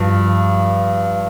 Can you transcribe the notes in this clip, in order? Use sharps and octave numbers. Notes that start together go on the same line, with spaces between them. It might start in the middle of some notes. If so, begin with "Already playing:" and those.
Already playing: G2 F3